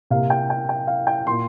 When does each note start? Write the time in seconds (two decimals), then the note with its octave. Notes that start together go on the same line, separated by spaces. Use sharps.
0.10 C3 A#3 F5
0.30 G5
0.50 G5
0.69 G5
0.87 F5
1.07 G5
1.27 A#2 A#3 C6